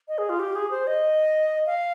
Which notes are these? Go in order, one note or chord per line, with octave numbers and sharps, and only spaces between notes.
D#5
G#4
F4
G4
G#4
C5
D#5
F5